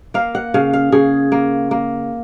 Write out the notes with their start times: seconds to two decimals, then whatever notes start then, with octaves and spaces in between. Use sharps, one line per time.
0.14 A#3 F5
0.35 F#5
0.54 C#3 F5
0.73 F5
0.92 C#3 G#4
1.32 A#3
1.71 A#3